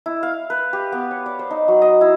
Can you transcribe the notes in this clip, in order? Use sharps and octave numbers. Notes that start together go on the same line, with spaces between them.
E4
F5
B4
G4
B3
C#5
D5
C5
D#4
F#3
D#5
E4